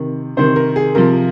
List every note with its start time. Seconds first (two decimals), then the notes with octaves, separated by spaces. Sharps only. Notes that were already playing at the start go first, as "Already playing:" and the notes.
Already playing: C3 D#3
0.37 C3 D#3 C5
0.56 A#4
0.76 G#4
0.95 C3 F3 A#4